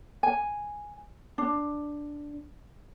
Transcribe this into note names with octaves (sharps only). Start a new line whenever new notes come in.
G#5
D4